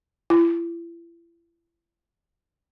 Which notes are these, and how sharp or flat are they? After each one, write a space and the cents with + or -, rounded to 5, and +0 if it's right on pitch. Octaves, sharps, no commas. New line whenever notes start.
E4 +40